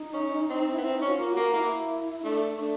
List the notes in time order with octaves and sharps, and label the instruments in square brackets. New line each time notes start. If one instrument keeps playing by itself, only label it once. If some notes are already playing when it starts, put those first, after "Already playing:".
Already playing: [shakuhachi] D#4
[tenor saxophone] C#4
C4
[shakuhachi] E4
[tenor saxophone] B3
[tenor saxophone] C4 [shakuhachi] D#4
[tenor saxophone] C#4
[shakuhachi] F#4
F4
[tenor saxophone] A#3
[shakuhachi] F#4
[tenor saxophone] A#3
[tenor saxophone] A#3 [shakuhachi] E4
[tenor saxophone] A3 [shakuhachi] D4
[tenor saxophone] A3 [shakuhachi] D4